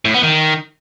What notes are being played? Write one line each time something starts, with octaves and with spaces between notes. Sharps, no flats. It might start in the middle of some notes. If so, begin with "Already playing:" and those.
A2
B3
D#3